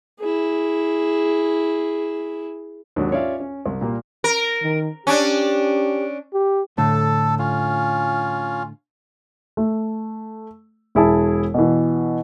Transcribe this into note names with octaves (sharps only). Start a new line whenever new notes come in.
E4 G#4
D#2 G#2 F#3 D4
C#4 F4 C#5 D5 E5 F5
C#4
C2
A#2 G3 A#3
A#4
D#3
C#4 D4 G4
G4
A2 D3 A3 A4 A5
C#4 F4
A3
E1 E4 G#4 A5
B2 E3